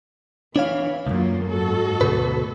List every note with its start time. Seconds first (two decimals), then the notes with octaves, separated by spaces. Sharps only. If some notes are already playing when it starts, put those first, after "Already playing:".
0.56 E3 D4 C#5 F5
1.07 C#2 F#2 F#3 A#3 F4
1.48 G#2 F#4 A4
2.01 D2 B2 B4